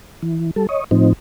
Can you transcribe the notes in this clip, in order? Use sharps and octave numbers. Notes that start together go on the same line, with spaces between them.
E3
G3 A4
C#5 D#5
A2 F3 C4 D#4